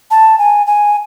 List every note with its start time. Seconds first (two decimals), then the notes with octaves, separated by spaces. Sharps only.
0.11 A5
0.39 G#5
0.67 G#5